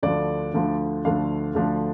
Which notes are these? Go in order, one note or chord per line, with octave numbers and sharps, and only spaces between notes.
D2 D3 F3 A3 D4 D5
D2 D3 F3 A3 D4
D2 D3 F3 A3 D4 F5
D2 D3 F3 A3 D4